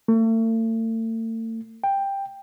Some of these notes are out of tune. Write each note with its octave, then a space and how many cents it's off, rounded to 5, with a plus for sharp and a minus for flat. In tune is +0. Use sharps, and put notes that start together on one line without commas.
A3 +40
G5 +10